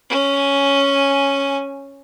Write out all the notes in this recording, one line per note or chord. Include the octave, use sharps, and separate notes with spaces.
C#4 G#5